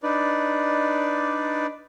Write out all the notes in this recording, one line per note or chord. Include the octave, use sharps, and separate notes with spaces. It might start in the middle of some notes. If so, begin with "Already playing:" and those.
D4 D#4 B4 D5